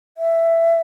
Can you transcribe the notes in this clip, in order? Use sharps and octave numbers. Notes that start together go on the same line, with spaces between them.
E5